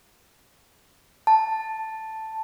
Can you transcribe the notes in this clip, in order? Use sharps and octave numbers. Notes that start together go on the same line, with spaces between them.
A5